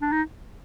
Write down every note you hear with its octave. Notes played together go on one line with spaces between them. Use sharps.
D4
D#4